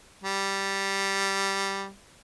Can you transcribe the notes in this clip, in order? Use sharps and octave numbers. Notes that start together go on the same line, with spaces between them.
G3